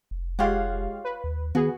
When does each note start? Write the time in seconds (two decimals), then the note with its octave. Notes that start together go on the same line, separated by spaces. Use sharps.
0.11 F1
0.39 G#3 F4 G4 C#5 F5 F#5
1.05 B4
1.24 D#2
1.55 D#3 B3 F#4 G#4